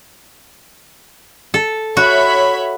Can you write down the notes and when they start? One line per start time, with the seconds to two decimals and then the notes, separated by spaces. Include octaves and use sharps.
1.54 A4
1.97 F#4 C#5 E5 B5